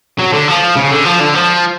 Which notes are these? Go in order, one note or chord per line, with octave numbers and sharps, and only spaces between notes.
F#3
D3
F3
C#3
D3
F3
D3
F3